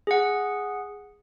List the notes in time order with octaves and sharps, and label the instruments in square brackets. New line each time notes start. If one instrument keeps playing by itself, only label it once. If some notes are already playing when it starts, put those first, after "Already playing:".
[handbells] G#4 F#5